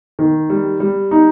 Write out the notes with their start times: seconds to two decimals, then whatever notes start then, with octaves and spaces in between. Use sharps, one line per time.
0.19 D#3
0.50 G3
0.80 G3
1.11 D#4